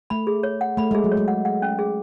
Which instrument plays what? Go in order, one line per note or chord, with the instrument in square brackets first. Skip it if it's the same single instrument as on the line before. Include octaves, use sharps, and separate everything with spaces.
[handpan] A3 [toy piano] B5
[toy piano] G#4
C#5
F#5
[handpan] A3 [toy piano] B5
[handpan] G#3 [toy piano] G#4
[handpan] F#3
[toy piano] C#5
[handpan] G#3
[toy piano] F#5
F#5
C#4
G#4